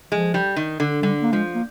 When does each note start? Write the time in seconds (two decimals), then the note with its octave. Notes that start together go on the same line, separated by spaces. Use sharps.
0.12 F3 G#3
0.34 G3
0.56 D#3
0.80 D3
1.02 D3 G3
1.22 A#3
1.33 F3 G#3
1.55 A#3